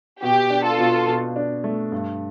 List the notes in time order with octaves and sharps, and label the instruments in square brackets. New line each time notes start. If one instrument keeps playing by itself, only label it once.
[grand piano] B2 [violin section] G4
[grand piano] D4
[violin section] F4 A4
[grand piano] B2
B2
D4
A3
G2